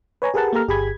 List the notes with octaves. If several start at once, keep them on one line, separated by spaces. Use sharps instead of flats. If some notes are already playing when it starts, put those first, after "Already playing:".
B4 C#5 G#5 A#5
G4 G#4 A#4 B4 F#5 A5
A#3 G4 A4 A#5 F6
G1 G4 G#4 B5 G#6